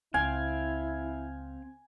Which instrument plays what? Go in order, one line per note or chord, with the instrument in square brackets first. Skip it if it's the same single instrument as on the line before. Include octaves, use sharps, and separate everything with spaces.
[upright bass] C#2 [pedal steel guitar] C4 F5 G5 [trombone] E4 [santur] G#5